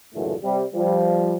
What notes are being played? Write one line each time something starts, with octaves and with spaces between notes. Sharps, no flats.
C#2 F#2 A2 D3 E3 A3
C3 G3
F3 G3